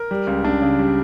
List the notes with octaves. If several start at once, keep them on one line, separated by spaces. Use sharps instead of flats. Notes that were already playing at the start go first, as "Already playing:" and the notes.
Already playing: A#4
G3
C#2
C#2 D4
C#3
G3